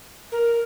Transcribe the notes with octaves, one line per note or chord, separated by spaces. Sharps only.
A#4